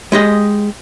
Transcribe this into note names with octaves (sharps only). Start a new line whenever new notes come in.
G#3 G4 D#5